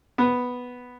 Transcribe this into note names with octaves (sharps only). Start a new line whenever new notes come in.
B3